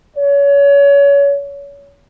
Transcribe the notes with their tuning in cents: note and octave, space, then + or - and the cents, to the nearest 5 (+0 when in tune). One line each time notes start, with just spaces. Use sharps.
C#5 +30